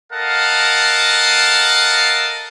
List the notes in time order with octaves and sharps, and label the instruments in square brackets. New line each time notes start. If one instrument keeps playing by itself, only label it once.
[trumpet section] A4 A#4 D#5 F5 F#5 A5